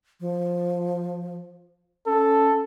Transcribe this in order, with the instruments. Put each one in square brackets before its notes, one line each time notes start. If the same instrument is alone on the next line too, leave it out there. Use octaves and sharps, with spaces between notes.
[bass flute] F3
[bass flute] C#4 [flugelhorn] A4